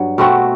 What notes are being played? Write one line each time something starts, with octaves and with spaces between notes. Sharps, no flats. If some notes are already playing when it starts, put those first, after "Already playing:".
Already playing: G2 F#3
B2 A3 C4 F#4